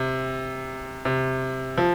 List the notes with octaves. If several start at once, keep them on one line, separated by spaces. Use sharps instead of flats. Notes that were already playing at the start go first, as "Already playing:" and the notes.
Already playing: C3
C3
F3